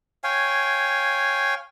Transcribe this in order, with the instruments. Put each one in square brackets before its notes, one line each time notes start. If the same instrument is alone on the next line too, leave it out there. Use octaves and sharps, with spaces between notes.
[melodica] C#5 F5 G5 G#5